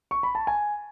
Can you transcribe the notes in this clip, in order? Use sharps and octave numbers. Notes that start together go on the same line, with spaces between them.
C#6
B5
A5
G#5